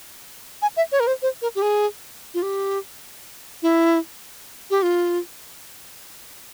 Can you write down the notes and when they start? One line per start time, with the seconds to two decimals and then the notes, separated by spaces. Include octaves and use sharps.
0.62 G#5
0.77 E5
0.92 C#5
1.00 A#4
1.07 C5
1.22 C5
1.42 A#4
1.55 G4
1.62 G#4
2.34 F4
2.42 G4
3.63 E4
4.70 G4
4.83 F4